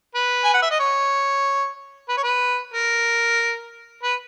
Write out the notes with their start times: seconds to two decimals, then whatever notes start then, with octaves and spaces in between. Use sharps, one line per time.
0.15 B4
0.44 G#5
0.54 F#5
0.62 E5
0.71 D#5
0.80 C#5
2.09 B4
2.17 C#5
2.23 B4
2.74 A#4
4.03 B4